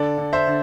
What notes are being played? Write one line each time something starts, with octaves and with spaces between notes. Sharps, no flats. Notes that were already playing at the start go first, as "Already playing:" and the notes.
Already playing: D3 A4 D5
D3
C5 E5
D3